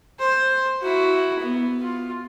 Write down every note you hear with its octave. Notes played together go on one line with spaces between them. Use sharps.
C5
E4 F#4
B3
F4